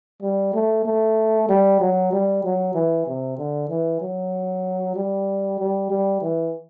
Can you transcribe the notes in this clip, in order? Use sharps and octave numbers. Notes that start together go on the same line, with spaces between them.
G3
A3
A3
G3
F#3
G3
F#3
E3
C3
D3
E3
F#3
G3
G3
G3
E3